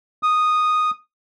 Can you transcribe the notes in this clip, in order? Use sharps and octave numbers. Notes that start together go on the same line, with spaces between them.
D#6